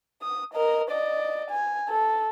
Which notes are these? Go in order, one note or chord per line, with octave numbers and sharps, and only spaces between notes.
D#6
A#4 D#5
D5 D#5
G#5
A4